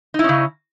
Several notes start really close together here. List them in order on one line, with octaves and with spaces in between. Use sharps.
D#4 E4 C#4 C#3